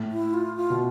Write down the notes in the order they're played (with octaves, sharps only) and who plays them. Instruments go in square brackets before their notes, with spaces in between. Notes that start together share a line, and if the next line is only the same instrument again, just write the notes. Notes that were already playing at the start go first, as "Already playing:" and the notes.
Already playing: [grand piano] A2
[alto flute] E4
F4
F4
[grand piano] B2